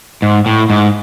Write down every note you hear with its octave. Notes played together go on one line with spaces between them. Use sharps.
G#2
A2
G#2